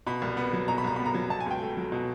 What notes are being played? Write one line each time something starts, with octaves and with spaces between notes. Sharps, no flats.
B2 B5
C2
B3
F#3
B2 A#5
B5
C2 A#5
B3 B5
A#5
F#3
B2 A5
G#5
C#2 G5
A3
F#3
B2